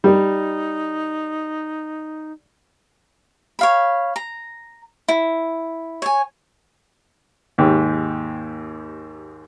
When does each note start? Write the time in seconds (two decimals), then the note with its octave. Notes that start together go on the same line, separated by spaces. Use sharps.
0.04 G3 D#4
3.59 C#5 F5 B5
4.16 A#5
5.08 E4
6.02 C#5 G#5
7.58 D#2 G#2 G4